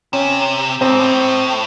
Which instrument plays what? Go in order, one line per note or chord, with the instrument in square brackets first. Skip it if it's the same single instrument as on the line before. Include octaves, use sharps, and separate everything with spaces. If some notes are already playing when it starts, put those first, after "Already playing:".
[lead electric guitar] C3 [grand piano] C#4
[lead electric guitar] A2 [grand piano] C4
[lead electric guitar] G#2
A2